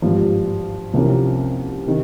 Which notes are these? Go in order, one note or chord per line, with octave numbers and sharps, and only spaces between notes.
G#1 G2 F3
C2 C3 F3 A#3 C#4
C3 D#3